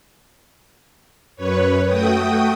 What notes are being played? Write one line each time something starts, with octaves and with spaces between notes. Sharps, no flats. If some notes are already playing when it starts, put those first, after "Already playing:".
F#2 B4 C#5
A3 F#4 G5 D#6